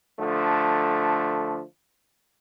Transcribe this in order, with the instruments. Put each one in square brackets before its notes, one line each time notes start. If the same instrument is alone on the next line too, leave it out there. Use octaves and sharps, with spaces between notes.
[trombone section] D3 F3 A3